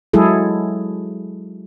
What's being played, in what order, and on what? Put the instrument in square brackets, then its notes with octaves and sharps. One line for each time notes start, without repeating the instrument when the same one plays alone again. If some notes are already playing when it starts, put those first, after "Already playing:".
[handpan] F#3 G#3 E4 G#4 A4